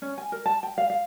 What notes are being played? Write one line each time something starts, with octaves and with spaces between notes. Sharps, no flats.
C#4
G#5
A#4
A5
G5
F5
F5